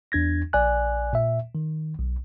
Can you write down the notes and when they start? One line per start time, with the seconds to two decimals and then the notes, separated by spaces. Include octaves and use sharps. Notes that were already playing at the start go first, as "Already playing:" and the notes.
0.12 E2 D4 G#6 A#6
0.53 A#1 D5 G#5 F#6
1.13 A#2 E5
1.55 D#3
1.99 B1